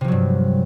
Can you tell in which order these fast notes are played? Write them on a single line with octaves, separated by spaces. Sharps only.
C3 F3 F#3 G2